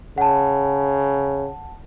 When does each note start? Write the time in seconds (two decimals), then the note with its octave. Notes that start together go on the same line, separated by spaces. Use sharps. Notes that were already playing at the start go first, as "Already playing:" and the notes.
0.18 C#3 F#5 A5